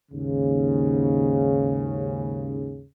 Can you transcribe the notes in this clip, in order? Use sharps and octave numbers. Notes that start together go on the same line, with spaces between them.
D#2 G#2 C#3